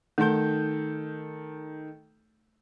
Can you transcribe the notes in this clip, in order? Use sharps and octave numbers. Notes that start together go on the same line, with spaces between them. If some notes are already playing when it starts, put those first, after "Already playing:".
D#3 A3 D#4 A4 G6